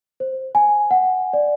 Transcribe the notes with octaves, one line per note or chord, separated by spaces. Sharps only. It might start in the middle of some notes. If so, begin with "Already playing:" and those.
C5
G#5
F#5
D5